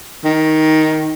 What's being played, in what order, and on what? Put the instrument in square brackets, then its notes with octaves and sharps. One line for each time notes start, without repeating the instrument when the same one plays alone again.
[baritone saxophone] D#3